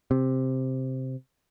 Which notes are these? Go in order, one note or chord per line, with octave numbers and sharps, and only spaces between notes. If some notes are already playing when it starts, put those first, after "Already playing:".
C3